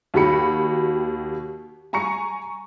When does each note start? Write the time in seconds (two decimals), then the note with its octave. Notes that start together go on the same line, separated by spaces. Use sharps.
0.14 D#2 F#4 G4 B5 C#7
1.93 G#5 A#5 C#6 C#7